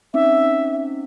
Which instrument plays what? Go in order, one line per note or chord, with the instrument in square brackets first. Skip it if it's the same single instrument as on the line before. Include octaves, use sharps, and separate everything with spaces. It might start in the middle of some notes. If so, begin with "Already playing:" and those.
[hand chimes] C4 C#4 D#4 [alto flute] E5